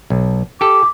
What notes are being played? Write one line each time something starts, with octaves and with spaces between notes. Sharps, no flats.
B1
G4 A4 D6